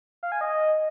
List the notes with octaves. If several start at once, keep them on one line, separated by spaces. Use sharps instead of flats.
F5
G#5
D#5